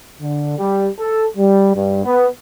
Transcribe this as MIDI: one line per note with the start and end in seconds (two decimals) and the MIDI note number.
0.21 0.55 50
0.59 0.89 55
0.99 1.27 69
1.37 1.73 55
1.74 2.04 43
2.05 2.28 59